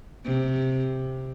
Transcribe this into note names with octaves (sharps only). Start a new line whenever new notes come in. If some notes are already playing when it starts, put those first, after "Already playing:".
C3